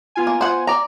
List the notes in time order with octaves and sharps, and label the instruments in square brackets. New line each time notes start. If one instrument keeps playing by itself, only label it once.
[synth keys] B3 F4 G#5
[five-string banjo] A#3
C5 F#5
D5 A#5